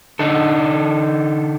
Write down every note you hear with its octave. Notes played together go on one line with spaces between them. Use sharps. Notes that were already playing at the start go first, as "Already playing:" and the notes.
D3 D#4 A4